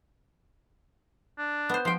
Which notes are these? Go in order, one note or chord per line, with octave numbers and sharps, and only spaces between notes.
D4
B3 C5
F3 G5 C6